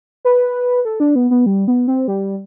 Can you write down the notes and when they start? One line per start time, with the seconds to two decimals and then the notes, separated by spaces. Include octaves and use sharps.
0.25 B4
0.85 A4
1.00 D4
1.15 B3
1.31 B3
1.46 G3
1.68 B3
1.88 C4
2.08 G3